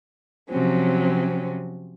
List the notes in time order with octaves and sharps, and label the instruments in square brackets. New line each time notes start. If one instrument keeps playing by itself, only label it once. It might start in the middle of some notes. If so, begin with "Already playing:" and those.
[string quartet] C3 F3 F#3 C4 C#4